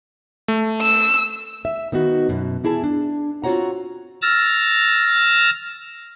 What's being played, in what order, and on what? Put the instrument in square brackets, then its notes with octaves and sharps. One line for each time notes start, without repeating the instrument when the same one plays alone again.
[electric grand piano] A3
[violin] E6
[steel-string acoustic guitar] E5
D#3 B3 D#4 F#4
F#2 B2
E3 E4 G#4 A5
D4
C4 F4 F#4 C#5 F#5 A#5
[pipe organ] E6 F6 A6 A#6